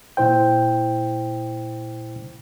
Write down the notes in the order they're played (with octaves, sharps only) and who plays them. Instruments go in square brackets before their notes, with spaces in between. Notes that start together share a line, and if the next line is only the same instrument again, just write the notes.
[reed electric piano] A#2 E4 C5 G5